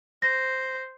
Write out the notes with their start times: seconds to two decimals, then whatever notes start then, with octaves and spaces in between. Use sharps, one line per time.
0.22 C5 A#6